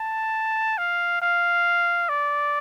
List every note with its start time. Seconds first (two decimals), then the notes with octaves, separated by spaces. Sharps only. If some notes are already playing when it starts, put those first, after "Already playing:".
Already playing: A5
0.78 F5
1.21 F5
2.09 D5